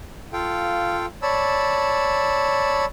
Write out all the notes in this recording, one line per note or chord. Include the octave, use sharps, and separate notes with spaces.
F4 A4 F5 G5
C#5 D5 A5 B5 E6